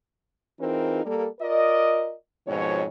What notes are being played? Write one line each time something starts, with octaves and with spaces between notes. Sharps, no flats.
E3 C4 D#4 F4 G#4 A#4
G3 A#3 A4
F4 A#4 D5 D#5
F2 G#2 B2 F3 C#5